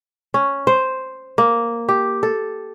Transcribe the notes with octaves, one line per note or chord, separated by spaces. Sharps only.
C#4
C5
A#3
G4
A4